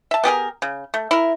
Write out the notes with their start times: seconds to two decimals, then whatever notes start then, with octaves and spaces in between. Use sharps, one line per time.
0.11 E5 A5
0.24 B3 G4 G#4 A#4
0.62 C#3
0.94 A3
1.11 E4 A#4